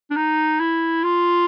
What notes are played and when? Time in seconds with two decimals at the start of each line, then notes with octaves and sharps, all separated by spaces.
0.11 D4
0.17 D#4
0.60 E4
1.04 F4